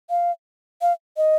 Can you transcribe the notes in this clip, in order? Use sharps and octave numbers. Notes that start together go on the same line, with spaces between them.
F5
F5
D#5